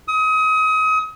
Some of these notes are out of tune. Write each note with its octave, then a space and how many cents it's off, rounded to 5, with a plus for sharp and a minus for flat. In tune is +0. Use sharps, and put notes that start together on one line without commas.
D#6 +30